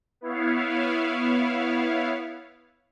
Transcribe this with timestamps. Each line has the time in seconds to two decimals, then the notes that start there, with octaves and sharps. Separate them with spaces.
0.21 B3 E4 C#5 F5